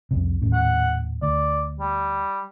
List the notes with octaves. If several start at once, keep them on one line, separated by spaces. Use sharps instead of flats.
C2 F2 C3
D#1 A2 C#4
F#5
D2 D5
G3